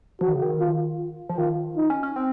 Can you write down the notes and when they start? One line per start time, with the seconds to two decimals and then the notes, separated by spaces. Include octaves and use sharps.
0.21 F3 F#4
0.27 D#3
0.34 C#3
0.42 D#3
0.60 F4
1.29 F3
1.38 D#3 F4
1.76 D#4
1.90 C#4
2.03 C#4
2.16 C4